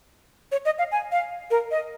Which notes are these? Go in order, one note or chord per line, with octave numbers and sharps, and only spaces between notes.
C#5
D#5
F5
G#5
F5
A#4
D#5